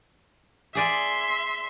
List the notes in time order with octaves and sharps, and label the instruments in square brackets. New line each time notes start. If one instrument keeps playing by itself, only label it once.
[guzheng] G#4 D5 G#5 [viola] E5 C6